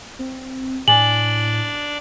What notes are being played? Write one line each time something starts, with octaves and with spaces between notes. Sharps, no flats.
C4
A2 D4 D5 G#5 F#7